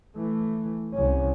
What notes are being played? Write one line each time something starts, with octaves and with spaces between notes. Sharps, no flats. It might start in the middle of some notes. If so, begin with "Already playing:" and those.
E3 A3
C2 C#4